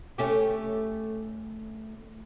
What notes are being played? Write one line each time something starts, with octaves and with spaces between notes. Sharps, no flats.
A3 C#4 G4